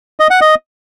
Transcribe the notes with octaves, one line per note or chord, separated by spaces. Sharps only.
D#5
F#5
D#5